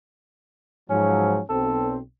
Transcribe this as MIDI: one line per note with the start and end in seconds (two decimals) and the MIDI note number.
0.90 1.39 44
0.90 1.39 53
0.90 1.39 54
0.90 1.42 61
1.50 1.97 35
1.50 1.97 60
1.50 1.96 69